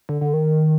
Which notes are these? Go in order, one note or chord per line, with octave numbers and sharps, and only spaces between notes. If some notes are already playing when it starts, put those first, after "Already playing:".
D3
D3
D#3